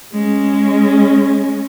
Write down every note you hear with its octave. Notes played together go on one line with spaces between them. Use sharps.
G#3 C#4